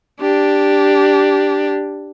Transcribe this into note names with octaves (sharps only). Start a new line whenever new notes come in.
D4 G4